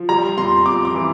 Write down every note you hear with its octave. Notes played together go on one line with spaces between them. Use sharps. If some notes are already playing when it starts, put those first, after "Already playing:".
Already playing: F3
G3 A#5
F2 C6
F2 D6
D6
E3